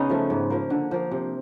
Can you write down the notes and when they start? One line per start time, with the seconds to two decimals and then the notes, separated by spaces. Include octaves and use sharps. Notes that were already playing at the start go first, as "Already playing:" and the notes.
Already playing: C#3 B3 C#4 D#4
0.10 F3 A3
0.30 G#2
0.50 F3 A#3
0.70 D3
0.91 F3 A#3
1.11 C3